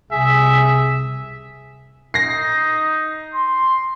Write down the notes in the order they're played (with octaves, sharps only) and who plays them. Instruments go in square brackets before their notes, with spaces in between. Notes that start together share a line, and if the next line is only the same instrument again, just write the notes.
[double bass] C2 C3 [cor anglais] G#4 [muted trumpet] E5
[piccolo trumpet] D#4 [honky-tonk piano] A#6 C7
[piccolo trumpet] C6